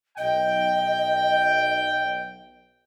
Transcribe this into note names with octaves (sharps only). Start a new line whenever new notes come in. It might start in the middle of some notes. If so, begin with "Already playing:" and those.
B1 D#5 G5